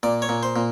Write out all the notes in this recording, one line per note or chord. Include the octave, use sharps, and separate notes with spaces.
A#2 D5
C#5
A#2
C5
A#2